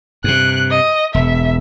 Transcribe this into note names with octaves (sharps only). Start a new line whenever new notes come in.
G2 C3 F#6
D#5
E1 E5